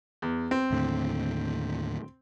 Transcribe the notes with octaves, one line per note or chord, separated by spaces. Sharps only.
E2
C4
D#2 A2 D3